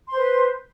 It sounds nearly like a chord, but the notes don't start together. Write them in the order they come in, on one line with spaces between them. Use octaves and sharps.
C6 C5 B4